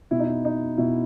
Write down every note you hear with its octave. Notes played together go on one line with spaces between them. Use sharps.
B2 E4
D#4
E4
D#4
B2 E4